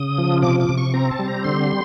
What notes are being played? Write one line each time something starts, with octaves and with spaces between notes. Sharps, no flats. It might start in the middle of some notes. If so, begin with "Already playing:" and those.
Already playing: C#3 D#6
F3
C3 D6
D6
C3
C#6
C4 A#5
A5
G3
A#5
D3 C6